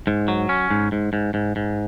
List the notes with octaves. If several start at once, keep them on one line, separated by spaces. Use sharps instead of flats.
G#2
F#3
C#4
G#2
G#2
G#2
G#2
G#2